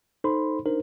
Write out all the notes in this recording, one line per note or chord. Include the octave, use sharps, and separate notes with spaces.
D#4 A4 C5 B5 C6
D4 D#4 A#4 C5